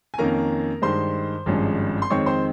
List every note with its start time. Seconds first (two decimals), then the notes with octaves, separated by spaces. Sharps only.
0.14 G#5
0.18 F2 D#3 A#3 C#4 A#4 A#5
0.82 G2 D#3 G#3 C5 C6
1.46 G#1 G2 F3 G#3 C#4
2.02 C6
2.10 F2 D#3 G#3 C4 C#5 C#6
2.26 C5 C6